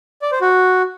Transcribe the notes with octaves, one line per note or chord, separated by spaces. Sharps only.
D5
C5
F#4